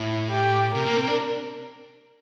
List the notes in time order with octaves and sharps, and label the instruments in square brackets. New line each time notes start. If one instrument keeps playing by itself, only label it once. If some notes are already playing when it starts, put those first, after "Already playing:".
Already playing: [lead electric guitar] A2 [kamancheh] E4
[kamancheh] G4
[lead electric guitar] C3 [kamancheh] A#4
[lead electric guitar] A#3
C4
D4